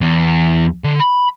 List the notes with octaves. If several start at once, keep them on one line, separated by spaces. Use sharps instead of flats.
E2
D3
B5